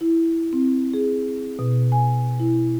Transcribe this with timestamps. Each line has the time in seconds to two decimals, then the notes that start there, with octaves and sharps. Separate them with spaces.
0.01 E4
0.53 C4
0.94 G#4
1.59 B2
1.92 G#5
2.40 E4